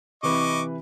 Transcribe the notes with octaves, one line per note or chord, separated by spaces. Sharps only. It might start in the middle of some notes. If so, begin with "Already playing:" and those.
C3 E3 B4 D#5 C#6 D6